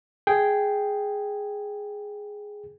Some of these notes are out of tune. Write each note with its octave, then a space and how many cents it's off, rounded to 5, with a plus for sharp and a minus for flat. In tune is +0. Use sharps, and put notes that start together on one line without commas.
G#4 +0 G5 +0